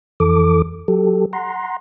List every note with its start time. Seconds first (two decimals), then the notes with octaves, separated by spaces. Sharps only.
0.20 F2 E3 A4 D6
0.88 F#3 G4 A4
1.33 F#5 A#5 C6